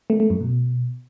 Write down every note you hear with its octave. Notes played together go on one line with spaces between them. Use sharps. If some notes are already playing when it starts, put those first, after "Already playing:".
A3
A3
F#2
B2